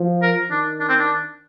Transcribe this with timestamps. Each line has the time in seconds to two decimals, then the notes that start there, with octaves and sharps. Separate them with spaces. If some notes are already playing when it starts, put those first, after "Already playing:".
Already playing: F3
0.22 A#4
0.51 D#3 D4
0.80 D4
0.89 C4
1.00 D4